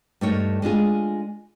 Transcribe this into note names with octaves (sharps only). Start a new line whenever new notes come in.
G2 A3 D#4 A#4 C#5
G#3 D4 F4 G#4